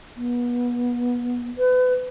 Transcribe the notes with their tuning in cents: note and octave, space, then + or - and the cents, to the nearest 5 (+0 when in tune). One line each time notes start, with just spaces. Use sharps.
B3 -25
B4 +35